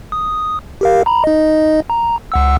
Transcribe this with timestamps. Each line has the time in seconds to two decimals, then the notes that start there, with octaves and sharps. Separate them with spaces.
0.12 D#6
0.81 G4 A#4 F5
1.06 A#5 B5
1.24 D#4 D#5
1.90 A#5
2.32 C#2 F#5 E6